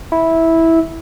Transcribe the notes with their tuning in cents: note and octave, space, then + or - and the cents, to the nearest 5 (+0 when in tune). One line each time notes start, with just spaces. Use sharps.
E4 -10